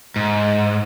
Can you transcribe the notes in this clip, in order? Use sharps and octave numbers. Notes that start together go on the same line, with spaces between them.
G#2